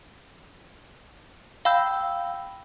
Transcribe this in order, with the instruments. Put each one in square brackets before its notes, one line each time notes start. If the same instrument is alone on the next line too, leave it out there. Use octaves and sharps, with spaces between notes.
[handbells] F5 G5 B5 E6 G6